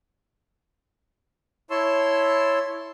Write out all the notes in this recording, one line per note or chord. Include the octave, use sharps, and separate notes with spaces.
E4 C#5 A5 C6 E6